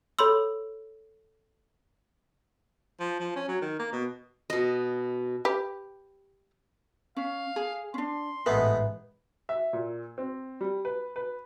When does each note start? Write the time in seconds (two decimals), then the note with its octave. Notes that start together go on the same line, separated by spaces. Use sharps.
0.19 A4 C#5 B5 C6 E6
3.00 F3
3.20 F3
3.36 C#4
3.49 F#3
3.62 D#3
3.79 A#3
3.92 B2
4.50 B2 D#5
5.45 G4 B4
7.17 C#4 F5
7.56 G#4
7.94 C#4 D4 C6
8.46 A1 G#2 G#3 A3 B3 B4
9.49 E5
9.73 A#2
10.18 C4
10.61 G3
10.85 B4
11.16 B4